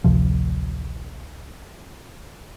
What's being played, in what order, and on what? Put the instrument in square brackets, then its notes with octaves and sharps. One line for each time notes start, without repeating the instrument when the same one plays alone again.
[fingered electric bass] A1 D2 C3 F3